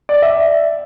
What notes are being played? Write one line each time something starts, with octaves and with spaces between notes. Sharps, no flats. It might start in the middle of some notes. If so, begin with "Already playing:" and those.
D5
E5